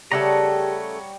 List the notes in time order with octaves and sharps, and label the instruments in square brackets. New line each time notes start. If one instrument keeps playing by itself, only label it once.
[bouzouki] C#3 A3 A4 [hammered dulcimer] G3 [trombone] G4 [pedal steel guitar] C#5 F#5 A#5